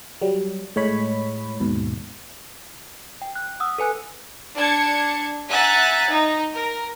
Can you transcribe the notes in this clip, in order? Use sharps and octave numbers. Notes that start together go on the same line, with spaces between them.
F#3 G3
A2 G#3 C#5 B5
D#2 G#2 B2
G5
F#6
F#5 D#6 E6
A4 B4 G#5 F#6
D4 A5 G#6 C#7
E5 F#5 G#5 A#5 F#6 A6
D#4
A#4